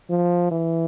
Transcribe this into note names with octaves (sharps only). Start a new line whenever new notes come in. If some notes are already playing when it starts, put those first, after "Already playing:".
F3
E3